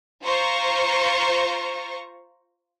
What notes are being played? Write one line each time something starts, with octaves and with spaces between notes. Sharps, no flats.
F4 C5 A#5 C#6